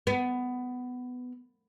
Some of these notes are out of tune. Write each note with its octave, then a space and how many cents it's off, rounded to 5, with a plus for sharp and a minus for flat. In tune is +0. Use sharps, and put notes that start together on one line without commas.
B3 +15